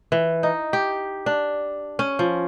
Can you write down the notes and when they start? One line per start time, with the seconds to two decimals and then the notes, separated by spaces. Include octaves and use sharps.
0.12 E3
0.43 D#4
0.73 G4
1.26 D4
1.99 C#4
2.19 F3